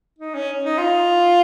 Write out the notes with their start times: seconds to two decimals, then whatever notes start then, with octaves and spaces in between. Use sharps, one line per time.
0.19 D#4
0.35 C#4
0.64 D#4
0.78 F4